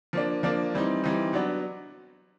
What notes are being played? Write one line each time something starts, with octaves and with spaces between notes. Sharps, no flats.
F3 A#3 D4
F3 A#3 D4
E3 G3 C4 D#4
E3 G3 C4 D#4
F#3 B3 D4